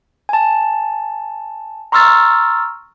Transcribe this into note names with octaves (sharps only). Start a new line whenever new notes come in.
G#5 A5
A#5 C6 C#6 E6 F6 A6